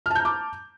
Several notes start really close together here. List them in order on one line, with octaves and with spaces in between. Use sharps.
F6 A5 G6 A#5 D6